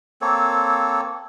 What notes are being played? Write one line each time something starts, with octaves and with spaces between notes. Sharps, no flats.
A#3 C4 A4 C#5